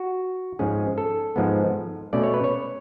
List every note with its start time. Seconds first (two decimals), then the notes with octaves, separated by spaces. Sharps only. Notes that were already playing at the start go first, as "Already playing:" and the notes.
Already playing: F#4
0.59 G#2 F3 G#3 C#4 G#4
0.98 A4
1.36 G#2 F3 G#3 B3
2.13 B2 A3 C#4 D5
2.23 C#5
2.34 B4
2.44 C#5